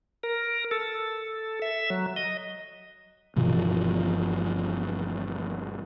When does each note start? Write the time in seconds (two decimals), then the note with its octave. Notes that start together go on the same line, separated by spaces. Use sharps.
0.23 A#4
0.71 A4
1.62 E5
1.90 F#3
2.16 D#5
3.36 G1 B2 E3 F3